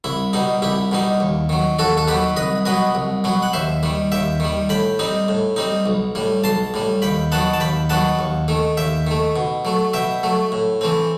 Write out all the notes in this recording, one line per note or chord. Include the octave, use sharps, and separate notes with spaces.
C2 E4
B2 G3 D#4
C2 E4 G4
B2 G3 D#4
D#2
D#3 F#3
D#2 F#4 A4
A4
D#3 F#3 G4 B4
C2 B4 D#5
B2 F#3 B3 B4 D#5
C2
B2 F#3 B3
F#5
D#2 C5 E5
D#3 G3
D#2 E5 G5
D#3 G3
A2 G5 B5
G3 C4 D#4
A2
G3 C4 D#4
B1
A2 G3
B1 A5 C6
A2 G3
D#2 G5 B5
D#3 F#3 B3 F#5 A5
A5
D#2 G5 B5
D#3 F#3 B3 F#5 A5
D#2
D#3 A3
D#2 E5 G5
D#3 A3
B2
F#3 A3
B2 E5 G5
F#3 A3
A2
E3 A3 C4